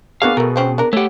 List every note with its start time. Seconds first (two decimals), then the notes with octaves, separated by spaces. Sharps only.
0.22 A#3 B3 D4 F#4 G#4 F5
0.37 B2 A3 A#4
0.56 F3 C4 C#4
0.78 D4 A#4
0.93 A3 G4 C#5 F#5